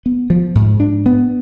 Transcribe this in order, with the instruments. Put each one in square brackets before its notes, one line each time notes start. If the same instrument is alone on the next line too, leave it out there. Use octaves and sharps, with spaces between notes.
[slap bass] B3
F3
G#2
D4
B3